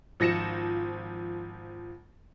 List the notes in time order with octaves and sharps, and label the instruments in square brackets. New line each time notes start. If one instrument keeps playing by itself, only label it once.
[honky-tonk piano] G#1 F3 A#6 C#7 E7